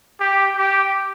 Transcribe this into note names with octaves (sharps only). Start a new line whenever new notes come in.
G4
G4